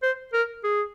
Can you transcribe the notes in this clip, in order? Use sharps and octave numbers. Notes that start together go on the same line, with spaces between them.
C5
A#4
G#4